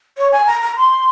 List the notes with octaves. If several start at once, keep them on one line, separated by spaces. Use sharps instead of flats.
C#5
G#5
A#5
A#5
C6